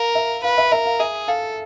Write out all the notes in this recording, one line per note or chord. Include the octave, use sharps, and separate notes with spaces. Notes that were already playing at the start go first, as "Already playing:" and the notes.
Already playing: A#4 F5
E5
B4 F5
E5
A#4 E5
F5
G#4 E5
A4 F5